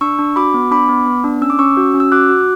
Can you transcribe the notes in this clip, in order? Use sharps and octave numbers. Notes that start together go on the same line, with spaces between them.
D4 C#6 E6
D4
F#4 B5 D6
B3
D4 B5 D6
B3
B3
D4
C#4 E6
D6
C#4 C#6 E6
F#4
C#4
E6
F#4 D6 F#6
F#4